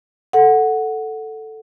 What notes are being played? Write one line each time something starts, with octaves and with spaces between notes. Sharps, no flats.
A4 F#5